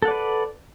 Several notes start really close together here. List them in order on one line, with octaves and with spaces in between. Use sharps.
A4 F#5 D5 B4